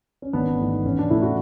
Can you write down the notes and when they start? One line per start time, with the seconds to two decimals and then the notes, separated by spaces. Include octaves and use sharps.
0.22 C#4
0.33 G#1 B3 D4
0.58 G#2 E3 A3
0.84 A1 C#4
0.99 D4
1.10 A2 E3 A3 E4
1.22 F#4